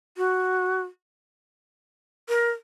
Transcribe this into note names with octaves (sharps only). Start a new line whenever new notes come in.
F#4
A#4